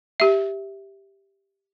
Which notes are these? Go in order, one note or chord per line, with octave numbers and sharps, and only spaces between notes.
G4 E5